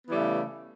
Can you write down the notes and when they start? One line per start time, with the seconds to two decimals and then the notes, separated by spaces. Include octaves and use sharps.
0.06 B3
0.08 E3
0.11 G3
0.13 A3
0.16 C#3